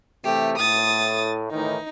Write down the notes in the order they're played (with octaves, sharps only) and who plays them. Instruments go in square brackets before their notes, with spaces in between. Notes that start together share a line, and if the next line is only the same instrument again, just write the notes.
[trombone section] C3 E3 A3 [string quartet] G4
[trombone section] A2 [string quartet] D#6 A6
[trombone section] A2 D#3 E3 [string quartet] D#4